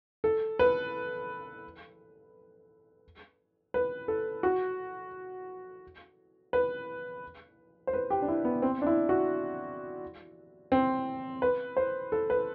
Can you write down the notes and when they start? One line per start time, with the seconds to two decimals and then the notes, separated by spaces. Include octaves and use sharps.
0.24 A4
0.59 B4
3.74 B4
4.08 A4
4.43 F#4
6.53 B4
7.87 C5
7.93 B4
8.10 G4
8.22 D4
8.28 E4
8.45 B3
8.62 C4
8.82 D4
8.87 E4
9.09 F#4
10.72 C4
11.42 B4
11.77 C5
12.12 A4
12.30 B4